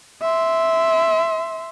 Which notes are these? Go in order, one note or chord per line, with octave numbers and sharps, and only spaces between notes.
E5 C6